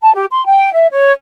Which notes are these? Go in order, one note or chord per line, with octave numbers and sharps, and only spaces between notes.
A5
G4
C6
G5
E5
C#5